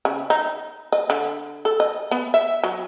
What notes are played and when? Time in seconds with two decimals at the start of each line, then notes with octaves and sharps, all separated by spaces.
0.05 C#3
0.30 D#4
0.93 D#5
1.10 D3
1.65 A4
1.80 D#5
2.11 B3
2.34 E5
2.64 F#3